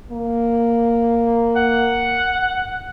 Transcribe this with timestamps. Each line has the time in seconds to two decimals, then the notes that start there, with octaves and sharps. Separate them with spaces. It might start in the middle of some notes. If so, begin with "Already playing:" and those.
0.10 A#3
1.56 F#5